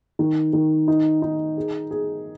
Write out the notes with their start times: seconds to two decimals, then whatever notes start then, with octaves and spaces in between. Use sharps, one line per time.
0.19 D#3
0.53 D#3
0.88 D#4
1.22 D#4
1.57 G#4
1.91 G#4